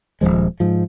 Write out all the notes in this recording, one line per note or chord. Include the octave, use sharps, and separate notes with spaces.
D#1 G#1 F3 G#3
G#2 F3